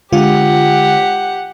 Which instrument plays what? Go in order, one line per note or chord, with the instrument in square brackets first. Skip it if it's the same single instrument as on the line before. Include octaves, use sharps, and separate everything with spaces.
[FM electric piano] D3 G#3 F4 [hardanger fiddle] G4 F#5